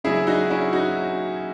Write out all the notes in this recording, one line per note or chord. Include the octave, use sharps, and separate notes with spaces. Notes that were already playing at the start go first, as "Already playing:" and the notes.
C#3 F#3 E4 G#4
D#4 F#4
C#4 E4
D#4 F#4